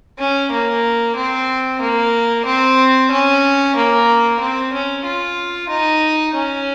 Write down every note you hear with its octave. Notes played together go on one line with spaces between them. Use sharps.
C#4
A#3
C4
A#3
C4
C#4
A#3
C4
C#4
F4
D#4
C#4